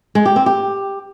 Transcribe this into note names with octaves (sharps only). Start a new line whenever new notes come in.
G#3
G4
C4
G4